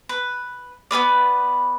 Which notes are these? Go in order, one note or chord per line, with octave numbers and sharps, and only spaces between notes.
B4
B3 C#4 B4 D5